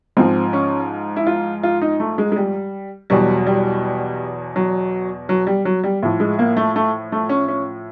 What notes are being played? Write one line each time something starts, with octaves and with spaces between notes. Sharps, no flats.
G#2 F3 C4
C#4
E4
F4
F4
D#4
A3
G#3
G#3
G3
E2 B2 F#3 G3
G3
F#3
F#3
G3
F#3
G3
A2 F3
G#3
A#3
A3
A3
A3
C#4
C#4